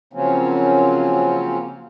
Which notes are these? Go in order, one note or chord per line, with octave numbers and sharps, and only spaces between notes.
C#3 F3 F#3 A#3 C4 C#4